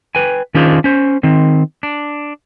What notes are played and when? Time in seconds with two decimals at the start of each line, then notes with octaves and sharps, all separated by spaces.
0.15 B4 G5 G#5
0.55 D#3 C#4 D4 F4 G#4 C5
0.84 C#4 C5
1.23 D#3 C4
1.83 D4